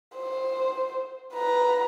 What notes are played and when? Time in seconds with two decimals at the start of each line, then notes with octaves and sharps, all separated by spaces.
0.16 C5
1.34 B4 A#5